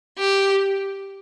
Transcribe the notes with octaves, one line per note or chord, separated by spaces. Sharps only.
G4